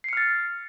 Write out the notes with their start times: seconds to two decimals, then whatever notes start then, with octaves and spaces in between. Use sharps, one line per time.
0.04 C7
0.09 C#7
0.13 F6
0.17 A6